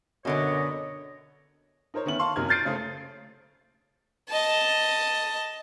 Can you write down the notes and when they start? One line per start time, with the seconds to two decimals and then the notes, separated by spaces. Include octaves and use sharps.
0.25 F#2 B2 D3 B3 C#5 D#5
1.94 D#4 A#4 C5 C#5
2.06 D#3 B3 C#4 E5 F#7
2.19 F5 A5 C6 C#6
2.36 F#2 C3 A#3 D#4 F6 G#6
2.49 F6 G6 A6 C7 D7 D#7
2.65 C#3 A3 G#4 A4 C5
4.29 D#5 A5